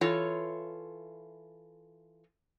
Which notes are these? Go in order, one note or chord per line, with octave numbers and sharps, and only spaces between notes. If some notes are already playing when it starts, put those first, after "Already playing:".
E3 F4 A4 C#5